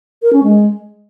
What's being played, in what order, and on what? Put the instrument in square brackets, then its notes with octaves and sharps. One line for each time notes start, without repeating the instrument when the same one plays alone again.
[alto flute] A#4
C#4
G#3